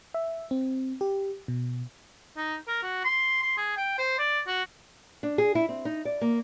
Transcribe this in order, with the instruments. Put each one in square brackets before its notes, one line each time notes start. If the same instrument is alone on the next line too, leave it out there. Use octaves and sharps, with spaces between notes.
[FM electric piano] E5
C4
G4
B2
[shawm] D#4
A#4
F#4
C6
C6
G#4
G5
C5
D5
F#4
[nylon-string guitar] D4
G#4
E4
C4
D#4
D5
A#3